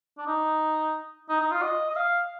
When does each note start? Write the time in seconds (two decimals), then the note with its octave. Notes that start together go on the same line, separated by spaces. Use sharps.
0.18 D4
0.27 D#4
1.29 D#4
1.40 D#4
1.51 F4
1.62 D#5
1.89 D#5
1.97 F5